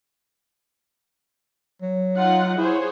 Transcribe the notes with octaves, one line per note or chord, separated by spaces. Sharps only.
F#3
D#4 F4 F#5
E4 G#4 C5 C#5